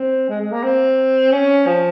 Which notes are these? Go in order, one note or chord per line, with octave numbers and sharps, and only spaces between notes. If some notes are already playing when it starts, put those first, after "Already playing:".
Already playing: C4
G#3
G#3
A#3
C4
C#4
F3